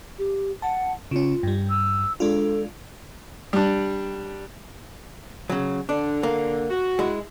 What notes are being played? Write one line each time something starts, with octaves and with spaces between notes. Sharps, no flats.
G4
F#5 A5
C#3 C#4 F4
G2 G3
E6
G#3 D4 F4 A4
G3 D4
C#3 F#3
D3 D4
A#3
F#4
G#3 E4